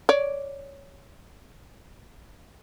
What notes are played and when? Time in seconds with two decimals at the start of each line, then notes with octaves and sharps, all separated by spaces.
0.09 C#5 D5